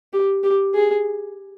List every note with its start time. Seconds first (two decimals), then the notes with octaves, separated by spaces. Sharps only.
0.13 G4
0.44 G4
0.74 G#4